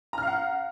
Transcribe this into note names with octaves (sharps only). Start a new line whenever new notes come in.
F5 F#5 A#5 F6